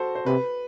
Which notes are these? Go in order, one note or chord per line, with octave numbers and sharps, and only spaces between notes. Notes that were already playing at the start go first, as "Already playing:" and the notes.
Already playing: F#4 A4 C5
C5
C3 B4